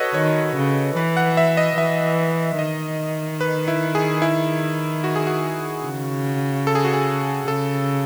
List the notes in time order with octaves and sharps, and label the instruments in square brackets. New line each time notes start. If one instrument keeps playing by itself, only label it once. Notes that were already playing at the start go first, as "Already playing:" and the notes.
Already playing: [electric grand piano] F#4 A4 B4 C#5 D#5
[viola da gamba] D#3 [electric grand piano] C#5
[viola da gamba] C#3
[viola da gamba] E3 [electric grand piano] B4
[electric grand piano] F#5
E5
D#5
[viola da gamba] E3 [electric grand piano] E5
[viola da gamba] D#3 [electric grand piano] D#5
[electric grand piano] B4
E4
G#4
E4
F#4
G#4
F#4
[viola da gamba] C#3
[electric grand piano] A4
G#4
F#4
G#4
[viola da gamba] C#3 [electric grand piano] A4